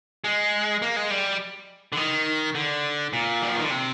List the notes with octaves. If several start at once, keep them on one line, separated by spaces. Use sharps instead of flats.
G#3
A#3
G#3
G3
D3
D#3
D3
A#2
G3
F3
D#3
D3
C3